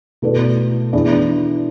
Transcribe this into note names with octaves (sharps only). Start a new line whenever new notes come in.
B2 A3 E4 B4 D5
E3 B3 D4 G#4 D5